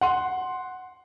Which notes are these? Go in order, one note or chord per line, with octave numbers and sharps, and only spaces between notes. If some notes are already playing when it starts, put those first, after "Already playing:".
F#5 C6